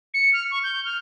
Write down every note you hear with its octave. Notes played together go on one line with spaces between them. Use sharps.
C#7
F6
C#6
G6
F6